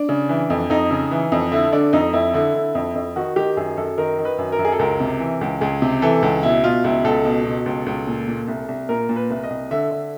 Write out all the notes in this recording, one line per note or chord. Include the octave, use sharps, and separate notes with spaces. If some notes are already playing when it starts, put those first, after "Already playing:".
Already playing: D4
C#3
E3
F2
F2 D#4
C#3
E3
F2
D3 E4
D3 D4
F2 D#4
F2 E4
D3 E4
D3
F2
F2
D#3 F#4
D#3 G4
F#2 G#4
F#2 A4
D#3 A#4
D#3
B4
F#2
A#4
F#2
G#4
A4
C#2 A#4
C3
E3
C#2
C#2 G#4
C3
E3 A4
C#2
B2 E4
B2 F4
C#2 E4
C#2 A4
B2
B2
C#2
C#2
A#2
A#2
C2
C2
A#2 A#4
A#2
B4
C2
D#5
C2
D3 E5
D3